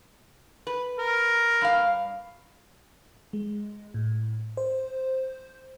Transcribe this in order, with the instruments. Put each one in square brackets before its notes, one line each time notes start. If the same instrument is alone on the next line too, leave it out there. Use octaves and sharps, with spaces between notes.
[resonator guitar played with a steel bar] B4
[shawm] A#4
[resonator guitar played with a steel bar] G2 F5
[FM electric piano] G#3
A2
C5